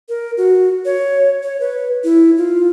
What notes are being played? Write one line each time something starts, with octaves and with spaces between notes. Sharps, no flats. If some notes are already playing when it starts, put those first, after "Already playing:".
A#4
F#4
C#5
C#5
B4
E4
F4